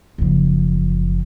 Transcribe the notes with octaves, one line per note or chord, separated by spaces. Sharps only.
F#1 F3